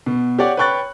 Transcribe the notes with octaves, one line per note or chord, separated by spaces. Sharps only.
B2
G4 C#5 D5 F#5
B4 C#5 G5 C#6 F#6 A6